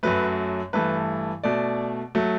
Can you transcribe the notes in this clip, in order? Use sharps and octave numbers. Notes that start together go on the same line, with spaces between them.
F#2 F#3 A3 B4
G2 E3 A3 B4
B2 A3 D5
F#3 A3